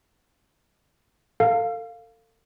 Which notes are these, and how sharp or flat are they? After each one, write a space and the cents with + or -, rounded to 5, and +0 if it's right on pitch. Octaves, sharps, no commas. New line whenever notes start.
A4 +40 F5 +0